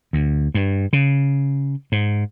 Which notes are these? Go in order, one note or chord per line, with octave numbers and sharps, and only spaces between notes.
D2
G2
C#3
G#2